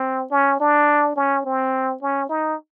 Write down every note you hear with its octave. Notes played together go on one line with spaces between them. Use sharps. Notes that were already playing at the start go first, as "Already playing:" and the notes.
Already playing: C4
C#4
D4
C#4
C4
C#4
D#4